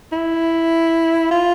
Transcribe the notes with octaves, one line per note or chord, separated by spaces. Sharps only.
E4
F4